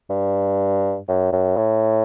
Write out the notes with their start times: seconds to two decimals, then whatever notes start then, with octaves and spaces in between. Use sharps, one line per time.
0.10 G2
1.08 F#2
1.32 F#2
1.57 A2